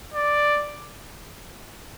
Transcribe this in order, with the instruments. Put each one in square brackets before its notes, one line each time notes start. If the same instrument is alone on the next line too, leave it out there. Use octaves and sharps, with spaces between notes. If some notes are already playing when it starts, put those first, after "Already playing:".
[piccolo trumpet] D5